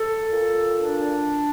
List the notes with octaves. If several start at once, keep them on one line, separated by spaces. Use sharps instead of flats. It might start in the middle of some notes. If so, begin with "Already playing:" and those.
Already playing: A4
A#2
D4